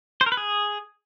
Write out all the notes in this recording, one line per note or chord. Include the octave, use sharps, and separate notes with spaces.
C5
A#4
B4
G#4